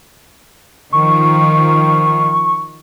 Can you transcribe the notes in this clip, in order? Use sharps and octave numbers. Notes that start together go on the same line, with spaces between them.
D#3 F3 C#6